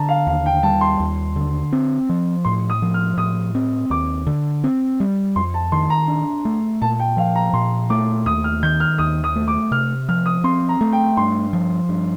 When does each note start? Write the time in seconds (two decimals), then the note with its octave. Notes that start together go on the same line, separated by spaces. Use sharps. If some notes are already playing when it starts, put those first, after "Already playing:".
Already playing: D3 A5 A#5
0.09 F5
0.27 D#2 F5
0.46 G5
0.63 G3 A5
0.81 C6
1.00 D#2
1.36 D3
1.73 C4
2.09 F3
2.45 A2 C6
2.70 D#6
2.82 F3
2.94 F6
3.17 A2 D#6
3.55 C4
3.90 D#2 D6
4.27 D3
4.64 C4
5.00 G3
5.36 F2 C6
5.54 A5
5.72 D#3 C6
5.90 A#5
6.08 D4
6.45 A3
6.82 A#2 A5
7.00 G5
7.17 F3 F5
7.36 A#5
7.53 A#2 C6
7.90 A3 D6
8.26 D#2 D#6
8.44 F6
8.63 D#3 G6
8.80 F6
8.98 D#2 D#6
9.24 D#6
9.36 A3
9.48 D6
9.71 C3 F6
10.09 F3 F6
10.26 D#6
10.44 C4 C6
10.69 A#5
10.81 A3
10.93 G5
11.17 G2 C6
11.53 F3
11.89 G2